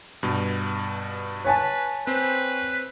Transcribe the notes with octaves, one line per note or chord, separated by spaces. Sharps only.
G2 B2
B4 C#5 G#5 A5
C4 B4 C5